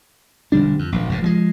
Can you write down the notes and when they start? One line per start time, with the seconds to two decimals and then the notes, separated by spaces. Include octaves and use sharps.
0.52 E1 D3 G3 D4
0.79 F2
0.92 D#1 A#1
1.09 F1 G#2
1.22 F3 F#3 G#3